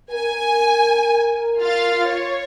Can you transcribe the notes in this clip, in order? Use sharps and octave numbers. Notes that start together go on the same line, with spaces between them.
A#4 G#5
F4 F5 A6
C#5